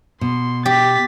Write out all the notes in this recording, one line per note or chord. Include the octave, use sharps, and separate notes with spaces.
B2 C6
G4 A6 B6